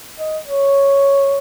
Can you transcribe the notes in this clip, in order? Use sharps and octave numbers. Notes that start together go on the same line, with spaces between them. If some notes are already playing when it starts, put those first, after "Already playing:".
D#5
C#5